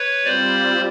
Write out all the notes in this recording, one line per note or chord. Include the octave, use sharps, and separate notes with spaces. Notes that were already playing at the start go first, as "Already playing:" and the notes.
Already playing: B4 C#5
G3 C4 F4 C5 D5